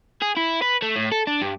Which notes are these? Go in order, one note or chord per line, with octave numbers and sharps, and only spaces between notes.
G#4
E4
B4
A3
A2
A4
D4
G2